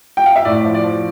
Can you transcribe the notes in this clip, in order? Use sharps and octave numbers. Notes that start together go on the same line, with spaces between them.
G5
F5
E5
A2 D5
F3
D5
F3